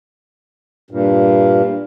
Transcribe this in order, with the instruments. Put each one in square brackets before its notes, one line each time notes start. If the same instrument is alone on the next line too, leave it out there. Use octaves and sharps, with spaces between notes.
[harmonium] G2 A#2